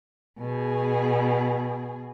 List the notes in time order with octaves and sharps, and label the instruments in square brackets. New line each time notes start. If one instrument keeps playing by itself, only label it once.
[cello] B2 G#4